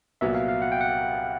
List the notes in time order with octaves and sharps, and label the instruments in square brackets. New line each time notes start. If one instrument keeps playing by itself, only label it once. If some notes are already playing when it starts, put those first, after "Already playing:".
[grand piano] C2 A#2 F#3 B3 [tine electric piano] E5
[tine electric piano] F5
F5
F#5
G5
F#5